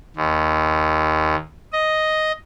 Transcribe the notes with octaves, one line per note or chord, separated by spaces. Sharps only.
D#2
D#5